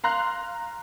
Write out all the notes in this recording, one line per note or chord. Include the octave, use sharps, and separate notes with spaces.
F5 A#5 C6 F#6